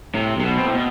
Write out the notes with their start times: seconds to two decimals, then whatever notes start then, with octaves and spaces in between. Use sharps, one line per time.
0.14 A2 C3
0.37 B1 C3
0.43 B2
0.58 C4
0.66 A2
0.73 B2